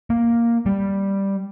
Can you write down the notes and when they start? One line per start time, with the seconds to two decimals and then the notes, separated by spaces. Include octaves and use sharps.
0.10 A#3
0.66 G3